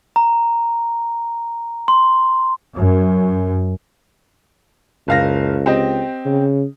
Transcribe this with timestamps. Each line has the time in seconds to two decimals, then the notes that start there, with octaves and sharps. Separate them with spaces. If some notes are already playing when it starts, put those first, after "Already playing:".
0.16 A#5
1.88 C6
2.74 F#2
5.08 F#1 C#2 F5 A#6
5.66 C4 G4 D#5
6.26 C#3